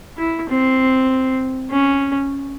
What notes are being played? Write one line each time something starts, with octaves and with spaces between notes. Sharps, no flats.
E4
C4
C#4